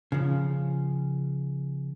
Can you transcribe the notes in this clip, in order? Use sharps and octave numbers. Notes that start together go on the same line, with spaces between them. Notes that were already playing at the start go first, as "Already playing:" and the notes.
C#3 F3